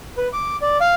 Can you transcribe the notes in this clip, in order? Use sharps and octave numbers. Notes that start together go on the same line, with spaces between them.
B4
D6
D5
F5